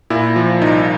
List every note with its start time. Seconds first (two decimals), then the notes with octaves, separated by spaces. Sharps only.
0.10 A#2 E4
0.36 F3
0.61 C2 D#4